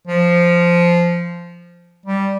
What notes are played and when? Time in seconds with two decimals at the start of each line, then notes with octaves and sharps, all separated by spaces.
0.07 F3
2.06 G3